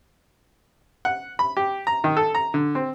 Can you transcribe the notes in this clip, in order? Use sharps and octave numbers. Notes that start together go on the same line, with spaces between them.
F#5
B5
G4
A#5
D#3
A4
A#5
D3
C4